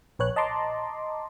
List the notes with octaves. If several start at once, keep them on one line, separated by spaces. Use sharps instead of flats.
A#1 B4 C#5 F#6
D#5 A5 A#5 C6 D6